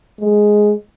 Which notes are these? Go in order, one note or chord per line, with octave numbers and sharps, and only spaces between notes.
G#3